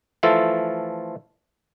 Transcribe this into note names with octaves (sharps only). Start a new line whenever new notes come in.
E3 F3 A3 F4 A4